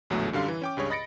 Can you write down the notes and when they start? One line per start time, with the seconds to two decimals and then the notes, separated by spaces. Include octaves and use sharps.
0.10 A#1 E2 A2 D3 F#3 A3
0.33 F#2 D3 G3 F5 C6
0.48 E3
0.62 C#4 G5 D6
0.77 C#2 G2 G#4 C#5
0.90 D#5 B5 A6 A#6 C#7 D7